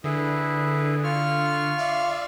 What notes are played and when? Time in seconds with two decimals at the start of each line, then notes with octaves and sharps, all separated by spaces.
0.04 D3 E4 G#4 B4
1.04 F4 C#6 F6
1.78 D5 E5 F5